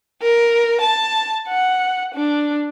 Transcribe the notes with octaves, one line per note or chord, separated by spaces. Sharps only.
A#4
A5
F#5
D4